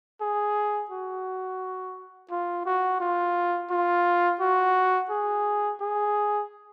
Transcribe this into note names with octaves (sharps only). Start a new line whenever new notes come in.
G#4
F#4
F4
F#4
F4
F4
F#4
G#4
G#4